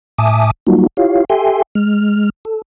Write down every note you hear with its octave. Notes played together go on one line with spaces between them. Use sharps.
A2 E5 G#5 A5 D6 D#6
F#3 G3 A#3 D#4 F4 F#4
E4 F4 G4 C#5 F5
G4 A4 E5 G5 G#5 C6
G#3 F6
A4